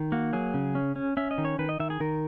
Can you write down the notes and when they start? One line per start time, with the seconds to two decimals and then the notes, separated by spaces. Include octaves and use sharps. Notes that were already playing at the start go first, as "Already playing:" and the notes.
Already playing: D#3
0.12 A#3 F#4
0.33 F#3 G#4
0.54 C#3
0.75 C#4
0.96 C#4
1.17 C#4 E5
1.31 D#5
1.38 D#3
1.45 C#5
1.59 D#3 B4
1.69 D#5
1.80 D#3 E5
1.90 G#4
2.00 D#3 A#4